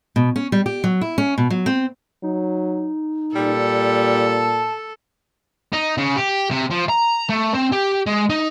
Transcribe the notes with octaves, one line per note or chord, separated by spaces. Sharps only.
B2
C#4
G3
G4
F#3
E4
C#4
B2
F#3
C4
F#3 D#4
A#2 G3 A4
A5
D#4
C#3
G4
C3
F3
A#5
A3
C4
G4
G#3
D#4